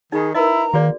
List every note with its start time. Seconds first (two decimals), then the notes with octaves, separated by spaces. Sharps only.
0.12 D#3 D#4 G#4 B5
0.34 E4 A#4 B4 D#5 A#5
0.74 D#3 A#3 F#4 G#4 D5